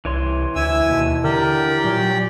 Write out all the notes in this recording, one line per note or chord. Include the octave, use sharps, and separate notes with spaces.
C2 E3 C#5 C6
D2 E4 G#5 E6
D#2 B2
D3 G4 A#4 D5 G5
A#2 F#3